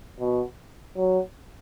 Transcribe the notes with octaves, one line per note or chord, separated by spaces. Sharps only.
B2
F#3